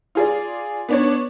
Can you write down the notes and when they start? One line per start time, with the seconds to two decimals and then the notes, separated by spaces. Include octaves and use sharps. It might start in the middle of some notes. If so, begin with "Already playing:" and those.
0.15 F4 G#4 D5
0.89 B3 D4 C#5